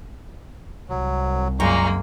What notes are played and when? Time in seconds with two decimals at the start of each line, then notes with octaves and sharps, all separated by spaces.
0.89 C2 F#3
1.60 F#2 A#2 G#3 A#3 A#5 C#6